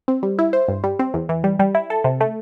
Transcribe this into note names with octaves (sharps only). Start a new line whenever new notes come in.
C4
G3
E4
C5
G2
G3
C4
E2
E3
G3
G3
E4
A4
C3
A3